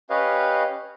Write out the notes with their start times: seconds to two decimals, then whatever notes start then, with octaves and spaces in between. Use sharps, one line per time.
0.10 C#4 G4 B4 C#5 D#5 F5